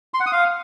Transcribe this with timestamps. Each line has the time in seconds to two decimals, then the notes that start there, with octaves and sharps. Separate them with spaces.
0.14 C6
0.20 F#5
0.26 D#6
0.32 F5